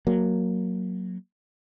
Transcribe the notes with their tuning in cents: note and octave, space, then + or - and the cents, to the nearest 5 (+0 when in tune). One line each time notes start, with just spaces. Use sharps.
F#3 +0 A#3 +0